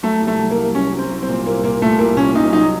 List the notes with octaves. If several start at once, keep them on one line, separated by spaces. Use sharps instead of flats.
F#3 A3
C2
A3
F#3
A#3
C2
F#3 C#4
F#3
C4
C2
C4
A#2
C2 A#3
A#2 A#3
A#2 A3
C2 A#3
A#2 C#4
C2 D#4
F#3 D#4